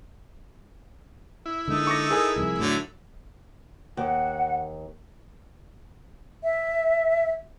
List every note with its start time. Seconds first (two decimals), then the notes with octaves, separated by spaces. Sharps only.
1.46 E4
1.68 D3 G#3 A#3 D#4 A4
1.87 C#6 D6 A#6
2.11 G#4 A#4 G#5
2.36 C2 F2
2.58 A2 D3 F#3 A3
3.97 D#2 F#5
6.44 E5